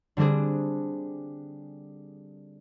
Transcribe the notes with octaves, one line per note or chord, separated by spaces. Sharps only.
D3 G3 C4 D4 G#4